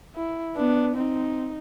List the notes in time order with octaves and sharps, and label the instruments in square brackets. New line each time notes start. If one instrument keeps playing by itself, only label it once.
[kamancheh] E4
[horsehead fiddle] B3 [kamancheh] D4
[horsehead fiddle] C4 [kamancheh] D#4